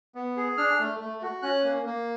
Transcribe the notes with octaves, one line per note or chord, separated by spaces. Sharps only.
B3
G#4
D4 F6
A3
A3
F#4
C#4 F#6
A#3
A#3